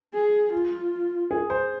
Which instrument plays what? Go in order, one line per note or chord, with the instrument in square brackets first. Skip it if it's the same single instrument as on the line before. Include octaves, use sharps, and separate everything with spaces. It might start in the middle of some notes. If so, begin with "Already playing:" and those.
[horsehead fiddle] G#4
F4
[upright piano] G#4
C5